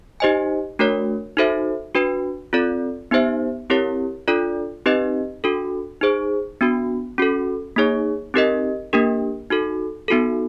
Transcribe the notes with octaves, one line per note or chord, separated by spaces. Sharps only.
D#4 G4 C5 D#5 G#5
A3 D4 F#4 A#4 C#5
D#4 F#4 A4 C5 E5
D4 F#4 B4
C4 F4 A4 D5
B3 D#4 G4 C5 E5
C4 E4 G4 A#4 C#5
D4 F4 A4 D5
C4 D#4 G4 B4 D#5
D4 F#4 A4
D#4 G#4 C5
B3 D4 F#4
C#4 F#4 A4
A#3 D#4 G#4 C#5
C4 D#4 G4 A#4 D#5
A#3 D4 G4 A#4
D#4 F#4 A4
B3 D#4 F#4 A4